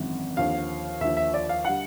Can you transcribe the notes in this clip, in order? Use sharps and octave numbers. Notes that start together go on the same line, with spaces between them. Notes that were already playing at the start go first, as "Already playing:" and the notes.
Already playing: G#1 F#2 C#3 E3
D#2 D3 F3 F5
D#2 D3 F3 E5
E5
D5
F5
D3 G3 F#5